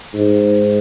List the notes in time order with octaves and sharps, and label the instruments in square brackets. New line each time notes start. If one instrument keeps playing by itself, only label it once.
[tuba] G#2